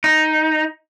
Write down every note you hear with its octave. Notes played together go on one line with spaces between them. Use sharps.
D#4